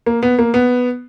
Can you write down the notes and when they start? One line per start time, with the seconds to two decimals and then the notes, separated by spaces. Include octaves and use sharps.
0.06 A#3
0.23 B3
0.39 A#3
0.54 B3